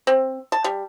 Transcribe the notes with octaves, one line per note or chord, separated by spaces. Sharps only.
C4
A5
G3